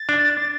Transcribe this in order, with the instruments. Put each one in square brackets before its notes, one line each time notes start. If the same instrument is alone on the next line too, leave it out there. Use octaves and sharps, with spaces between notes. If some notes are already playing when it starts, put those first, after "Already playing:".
Already playing: [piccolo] A6
[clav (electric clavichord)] D4